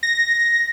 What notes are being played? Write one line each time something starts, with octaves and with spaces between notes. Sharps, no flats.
A#6